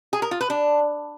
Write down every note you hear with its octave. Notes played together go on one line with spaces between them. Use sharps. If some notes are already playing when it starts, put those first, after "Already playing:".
G#4
A#4
F4
B4
D4